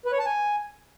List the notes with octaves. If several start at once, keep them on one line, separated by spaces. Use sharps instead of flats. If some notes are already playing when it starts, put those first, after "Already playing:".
B4
C#5
A5
G#5